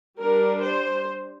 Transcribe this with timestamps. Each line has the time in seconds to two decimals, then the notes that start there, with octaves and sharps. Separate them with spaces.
0.16 G3 D4 A#4
0.63 C5